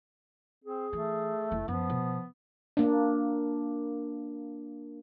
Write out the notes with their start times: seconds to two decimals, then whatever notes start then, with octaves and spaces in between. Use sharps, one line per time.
0.64 C4 G#4
0.93 E3 A3
1.51 F1 E4
1.68 F#2 F3 B3
1.90 B2
2.77 A#3 D4